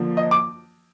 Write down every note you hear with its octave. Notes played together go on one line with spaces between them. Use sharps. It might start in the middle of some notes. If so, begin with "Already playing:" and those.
Already playing: D3 F3 A#3
D#5
D6